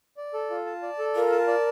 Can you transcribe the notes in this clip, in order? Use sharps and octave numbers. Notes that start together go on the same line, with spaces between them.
D5
A4
F4
A5
D5
A4
F4 A#4
A5
D5